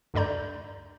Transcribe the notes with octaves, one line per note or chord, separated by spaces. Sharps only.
D2 G2 A4 D5 A#5 G6